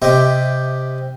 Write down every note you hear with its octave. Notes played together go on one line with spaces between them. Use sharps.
C3 G4 D#5 E5